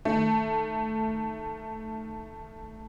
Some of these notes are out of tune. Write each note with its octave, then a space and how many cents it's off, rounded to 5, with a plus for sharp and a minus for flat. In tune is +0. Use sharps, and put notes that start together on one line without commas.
D#3 +0 A3 +0